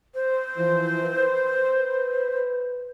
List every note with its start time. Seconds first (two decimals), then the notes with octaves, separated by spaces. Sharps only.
0.15 C5
0.56 E3 F3
1.03 B4